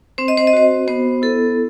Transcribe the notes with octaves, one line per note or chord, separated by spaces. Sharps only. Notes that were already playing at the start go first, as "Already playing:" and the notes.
C4 C5
D#5
C5
D#5
F#4 C5
B3 C5
E4 A4